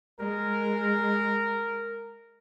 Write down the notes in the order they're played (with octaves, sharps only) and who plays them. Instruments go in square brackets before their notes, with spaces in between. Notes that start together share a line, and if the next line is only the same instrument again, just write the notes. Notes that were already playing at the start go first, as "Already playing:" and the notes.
[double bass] G#3 [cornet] A#4